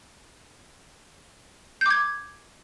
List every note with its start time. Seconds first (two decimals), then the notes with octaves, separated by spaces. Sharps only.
1.81 G6
1.86 D6
1.90 G#6